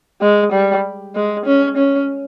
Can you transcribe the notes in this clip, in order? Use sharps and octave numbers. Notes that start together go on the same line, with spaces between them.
G#3
G3
G#3
C#4
C#4